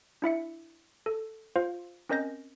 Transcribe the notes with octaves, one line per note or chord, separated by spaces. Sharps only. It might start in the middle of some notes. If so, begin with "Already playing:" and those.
D4 E4 E5 C#7
A4
F4 C5 F5
C4 C#4 A#4 D#5 G6 A#6